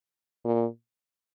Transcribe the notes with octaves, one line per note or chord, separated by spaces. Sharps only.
A#2